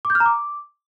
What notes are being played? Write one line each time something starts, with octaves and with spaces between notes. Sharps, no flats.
D6
G6
F6
A#5
D6